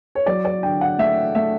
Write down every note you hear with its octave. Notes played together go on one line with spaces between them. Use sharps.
C#5
F#3 D5
D5
D3 G5
F#5
A3 E5
A3 E5